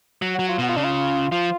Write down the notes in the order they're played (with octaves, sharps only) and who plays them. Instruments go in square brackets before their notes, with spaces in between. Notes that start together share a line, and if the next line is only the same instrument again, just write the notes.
[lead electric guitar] F#3
[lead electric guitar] F#3 [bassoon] F#4
[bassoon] F4
[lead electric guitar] B2 [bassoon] F#4
[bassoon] F4
[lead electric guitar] C#3 [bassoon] D4
[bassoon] F4
[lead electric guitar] F3 [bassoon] F4